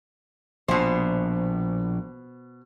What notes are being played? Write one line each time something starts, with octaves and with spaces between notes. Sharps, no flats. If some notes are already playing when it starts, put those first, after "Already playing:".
A#1 B2 C5